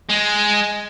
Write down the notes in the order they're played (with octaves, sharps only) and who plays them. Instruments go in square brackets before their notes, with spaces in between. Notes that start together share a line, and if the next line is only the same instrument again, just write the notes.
[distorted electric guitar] G#3